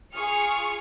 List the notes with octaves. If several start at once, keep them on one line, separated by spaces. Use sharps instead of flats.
F4 G#4 C#6 F6 C#7